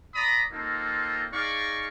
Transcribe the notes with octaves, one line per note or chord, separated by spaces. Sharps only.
D5 A#5 B5 D#6
A#3 C4 D#4 F4 A4
D#4 G#4 D5 F5 C#6